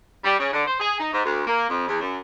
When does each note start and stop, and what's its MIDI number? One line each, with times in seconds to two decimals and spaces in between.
0.24 0.37 55
0.39 0.49 49
0.53 0.64 50
0.67 0.79 72
0.80 0.97 68
1.00 1.11 63
1.13 1.24 44
1.25 1.42 38
1.47 1.67 58
1.69 1.85 41
1.88 1.98 40
2.01 2.18 42